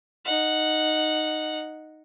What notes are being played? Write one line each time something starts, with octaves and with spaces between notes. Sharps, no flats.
D#4 F#5